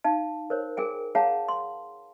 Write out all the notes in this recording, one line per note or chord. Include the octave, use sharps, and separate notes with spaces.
D#4 F5 A5
A#4 C5 C#5
G#4 A#4 G5 G#5
G#4 C#5 F5 F#5 A5 A#5
C6